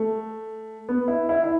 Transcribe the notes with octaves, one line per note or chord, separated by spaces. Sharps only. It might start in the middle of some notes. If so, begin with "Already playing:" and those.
Already playing: A3
B3
E4
E4
E4